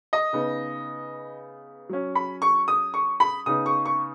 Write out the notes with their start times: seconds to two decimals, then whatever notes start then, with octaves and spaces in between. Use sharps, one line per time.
0.13 D#5
0.33 C#3 B3 D#4
1.89 F#3 C#4
2.15 B5
2.42 C#6
2.68 D#6
2.94 C#6
3.20 B5
3.46 C#3 B3 D#4 D#6
3.66 C#6
3.86 C#6